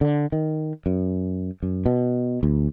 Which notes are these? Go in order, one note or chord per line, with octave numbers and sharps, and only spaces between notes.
D3
D#3
F#2
F#2
B2
D2